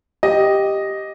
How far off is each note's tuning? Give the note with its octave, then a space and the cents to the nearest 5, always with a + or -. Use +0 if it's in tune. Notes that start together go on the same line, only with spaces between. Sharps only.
G4 +0 D#5 +0